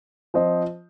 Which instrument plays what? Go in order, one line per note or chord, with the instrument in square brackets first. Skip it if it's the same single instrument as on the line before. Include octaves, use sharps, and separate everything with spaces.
[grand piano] F3 C4 F4 C5 D#5